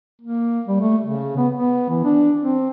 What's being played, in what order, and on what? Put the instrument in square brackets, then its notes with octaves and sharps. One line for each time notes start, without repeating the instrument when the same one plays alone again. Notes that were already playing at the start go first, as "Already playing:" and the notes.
[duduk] A#3
G3
A3
C#3
B3
B3
E3
D4
C4